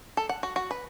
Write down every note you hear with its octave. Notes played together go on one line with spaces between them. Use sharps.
A4
F#5
F#4
F#4
B4